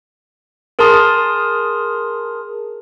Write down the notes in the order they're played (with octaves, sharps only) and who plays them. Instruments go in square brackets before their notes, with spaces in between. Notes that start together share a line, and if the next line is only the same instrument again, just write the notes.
[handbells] G#4 A#4 A5 A#5 C6 D#6